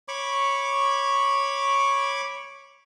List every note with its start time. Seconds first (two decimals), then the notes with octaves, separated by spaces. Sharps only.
0.08 C#5 B5 C#6 D6